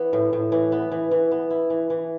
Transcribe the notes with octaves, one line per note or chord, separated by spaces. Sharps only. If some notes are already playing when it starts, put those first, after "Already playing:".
Already playing: E3 B3
A2
A2
E3
B3
E3
E3
B3
E4
E3
E3